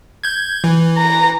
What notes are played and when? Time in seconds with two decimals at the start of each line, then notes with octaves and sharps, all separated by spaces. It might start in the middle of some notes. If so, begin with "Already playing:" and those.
0.24 G6 G#6
0.64 E3
0.98 A#5